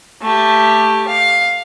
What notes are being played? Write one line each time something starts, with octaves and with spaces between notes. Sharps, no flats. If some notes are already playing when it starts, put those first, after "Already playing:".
A3 G4
F5